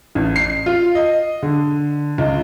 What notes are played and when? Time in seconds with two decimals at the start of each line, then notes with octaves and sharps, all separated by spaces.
0.15 A1
0.36 C7
0.66 F4
0.95 D#5
1.43 D3
2.18 C#2